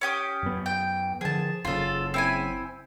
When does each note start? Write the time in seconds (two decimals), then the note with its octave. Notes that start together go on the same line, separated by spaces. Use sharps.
0.01 C#4 G4 D#6
0.43 F#2 B3
0.66 G5
1.21 D3 F3 G#4 A5
1.65 F#1 C#3 F4 A4
2.14 C4 E4 G#5